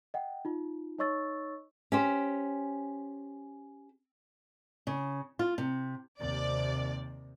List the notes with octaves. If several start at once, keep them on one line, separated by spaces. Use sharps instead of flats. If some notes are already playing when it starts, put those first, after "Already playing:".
D#5 F#5 G5
D#4 F4
D#4 C#5 D#5 C#6 E6 A6
C#4 G4 C5
C#3
F4
C3
D#2 C3 D5